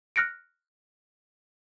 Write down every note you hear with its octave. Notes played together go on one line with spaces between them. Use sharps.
F6 F#6 A#6 C#7 D7